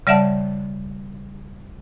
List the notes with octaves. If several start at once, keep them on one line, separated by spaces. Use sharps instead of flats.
C#3 G3 D5 E5 F#5 A5